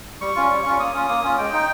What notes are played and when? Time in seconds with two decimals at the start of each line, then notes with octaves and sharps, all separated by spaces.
0.21 G3 C#6
0.35 C#4 F4
0.50 G3
0.65 C#4 F4
0.79 A#3 D#6
0.94 C#4 F4
1.09 A#3
1.23 C#4 F4
1.38 G#3 G5
1.53 D#4